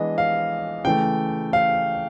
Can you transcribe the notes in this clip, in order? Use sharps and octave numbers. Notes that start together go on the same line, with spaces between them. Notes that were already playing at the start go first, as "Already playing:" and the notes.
Already playing: E3 G#3 B3 D4 D#5
F5
C#3 E3 A3 G5
F5